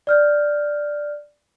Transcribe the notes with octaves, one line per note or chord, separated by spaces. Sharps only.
D5 F6 G6